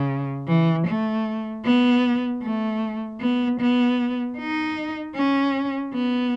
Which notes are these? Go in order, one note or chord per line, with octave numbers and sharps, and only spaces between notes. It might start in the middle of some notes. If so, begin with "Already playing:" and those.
Already playing: C#3
E3
A3
B3
A3
B3
B3
D#4
C#4
B3